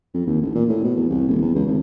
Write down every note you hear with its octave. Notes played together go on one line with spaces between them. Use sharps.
F2
D#2
A1
A#2
A2
B2
E2
C2
D#1
E2
C#2
G#1